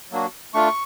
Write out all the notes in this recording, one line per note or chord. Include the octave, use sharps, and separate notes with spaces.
F#3 A#3 D4 F#4
A3 D4 F4 C#6